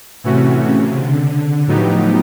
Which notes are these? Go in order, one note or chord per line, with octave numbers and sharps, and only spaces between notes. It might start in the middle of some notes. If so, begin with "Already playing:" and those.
A2 C3 E3 A3 C#4 F#4
C#3
D3
A2 F3 F#3 B3 D#4 G4